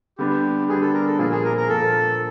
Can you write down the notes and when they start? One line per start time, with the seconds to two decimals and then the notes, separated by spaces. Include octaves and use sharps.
0.18 D3 G3 B3 D4 G4
0.69 D3 G3 B3 D4 G#4
0.81 A4
0.94 A#4
1.07 A4
1.19 A#2 F3 A#3 G#4
1.32 G#4
1.44 A#4
1.57 A#4
1.69 A#2 F3 A#3 A4